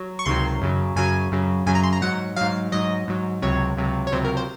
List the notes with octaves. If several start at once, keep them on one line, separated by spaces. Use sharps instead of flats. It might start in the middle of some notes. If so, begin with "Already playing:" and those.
Already playing: F#3
C#6
C#2 C3 D#3 F#3 C6
F#2 C#3 F#3
F#2 C#3 F#3 G#5
F#2 C#3 F#3
F#2 C#3 F#3 G#5
A#5
C6
A#5
G#2 F#3 F#5
G#2 F#3 F5
G#2 F#3 D#5
G#2 F#3
C#2 C3 F#3 C#5
C#2 C3 F#3
C#5
C#2 C3 F#3 C5
A#4
C5